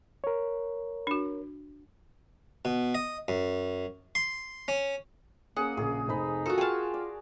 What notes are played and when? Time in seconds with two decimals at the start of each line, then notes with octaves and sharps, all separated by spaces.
0.24 A#4 C#5
1.07 D4 F#4
2.65 B2
2.95 D#5
3.28 F#2
4.15 C6
4.68 C#4
5.57 A#3 C#4 G#4 F#5 E6
5.77 A#1 C#3 G#4
6.08 F1 D#4 C5 B5
6.46 F4 F#4 A4 A#4 D#6
6.58 F4 G#4 G5 A5 F6
6.94 D5